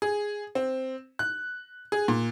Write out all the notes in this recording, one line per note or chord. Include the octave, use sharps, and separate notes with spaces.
G#4
C4
F#6
G#4
A#2